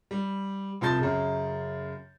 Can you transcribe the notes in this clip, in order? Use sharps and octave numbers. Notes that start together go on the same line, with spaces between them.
G3
C2 F3 A5 C6 G6 A6
F#2 C#3